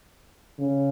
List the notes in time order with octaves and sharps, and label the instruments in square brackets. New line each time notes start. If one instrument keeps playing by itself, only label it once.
[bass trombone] C#3